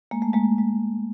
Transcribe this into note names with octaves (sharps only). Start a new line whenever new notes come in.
G#3 A#3
A3
G#3 A#3
G#3